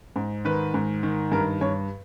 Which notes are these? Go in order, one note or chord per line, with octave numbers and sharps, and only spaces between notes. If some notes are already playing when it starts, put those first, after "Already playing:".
G#2
D#3 B4
G#2
D#3
G2 A#4
G2 C#5